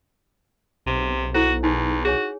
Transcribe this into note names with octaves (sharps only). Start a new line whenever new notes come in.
B1 C3
E4 F#4 A4 C5
E2 D#4
F#4 G#4 C#5 G#5